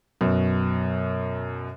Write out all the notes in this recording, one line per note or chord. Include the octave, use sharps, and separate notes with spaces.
F#2 B2